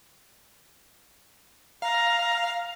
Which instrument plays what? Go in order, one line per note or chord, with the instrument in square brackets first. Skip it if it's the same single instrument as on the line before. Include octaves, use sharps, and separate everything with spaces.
[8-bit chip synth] F5 [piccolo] A#5